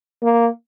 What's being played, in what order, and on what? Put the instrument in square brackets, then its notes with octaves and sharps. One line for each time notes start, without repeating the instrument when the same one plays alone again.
[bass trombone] A#3